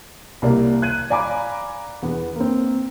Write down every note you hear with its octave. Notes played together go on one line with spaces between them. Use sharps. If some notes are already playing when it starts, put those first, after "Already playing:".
C2 A#3 D5
F#6 G#6 D#7
D5 F5 G#5 A#5 B5 D6
E2 B3
A#3 C4